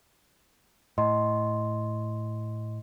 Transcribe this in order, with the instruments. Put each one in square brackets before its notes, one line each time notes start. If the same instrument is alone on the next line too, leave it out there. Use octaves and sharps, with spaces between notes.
[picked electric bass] A2 [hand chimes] D#5 C6